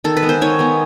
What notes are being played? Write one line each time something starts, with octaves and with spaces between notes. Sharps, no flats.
D#3 A4
B4
G#3 B3
C5
D#3 C#5
G#3 B3